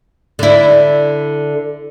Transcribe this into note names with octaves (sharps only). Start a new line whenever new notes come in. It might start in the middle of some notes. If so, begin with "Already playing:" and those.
D3 E4